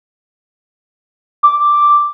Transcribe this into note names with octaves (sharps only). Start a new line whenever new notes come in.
D6